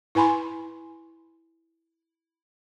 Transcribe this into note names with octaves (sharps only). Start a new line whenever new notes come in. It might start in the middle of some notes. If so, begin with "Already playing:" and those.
E4 B4 G#5 B5 C6